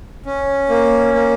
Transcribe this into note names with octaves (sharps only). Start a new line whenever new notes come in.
C#4
A#3
A#3